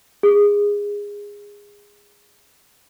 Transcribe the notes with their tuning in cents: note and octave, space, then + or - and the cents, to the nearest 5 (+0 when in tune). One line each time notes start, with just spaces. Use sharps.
G#4 -20